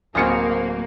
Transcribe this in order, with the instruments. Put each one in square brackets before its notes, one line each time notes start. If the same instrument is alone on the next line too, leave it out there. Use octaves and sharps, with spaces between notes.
[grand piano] D1 C4 C#7 [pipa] B2 F4 G#4 [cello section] A#3